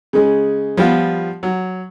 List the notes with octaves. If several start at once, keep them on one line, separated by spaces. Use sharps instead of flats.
C#3 G#3
F3 G3 B3 F4
F#3